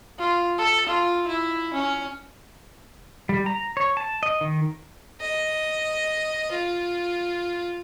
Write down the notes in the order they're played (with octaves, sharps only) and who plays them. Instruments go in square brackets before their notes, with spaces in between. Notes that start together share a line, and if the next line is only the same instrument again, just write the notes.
[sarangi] F4
A4
F4
E4
C#4
[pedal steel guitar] G3
A#5
C#5
A5
D#5
D#3
[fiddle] D#5
F4